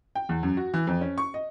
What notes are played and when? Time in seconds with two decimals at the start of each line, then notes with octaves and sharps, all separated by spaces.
0.15 G5
0.29 E2
0.43 F#2
0.57 F#4
0.74 E3
0.87 F2
1.01 C#4
1.18 C#6
1.34 D#5